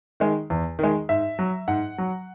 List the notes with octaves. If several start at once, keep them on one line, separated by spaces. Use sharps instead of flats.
D#3 G#3
E2
D#3 G#3
G#2 E5
F#3
G#2 F#5
F#3